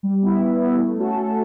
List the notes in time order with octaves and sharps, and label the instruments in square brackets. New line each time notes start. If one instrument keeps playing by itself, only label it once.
[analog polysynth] G3
B3 E4
G3
B3 E4
A3
C#4 F#4 A4
A3